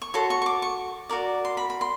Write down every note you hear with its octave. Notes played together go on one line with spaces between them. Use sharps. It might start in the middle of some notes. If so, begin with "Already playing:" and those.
C#6
F#4 A4 C#5 C6
C#6
C#6
D6
C#6
F#4 A#4 D5
C6
B5
B5
C6